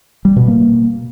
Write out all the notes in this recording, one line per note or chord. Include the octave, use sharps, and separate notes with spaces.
G3
B2
A#3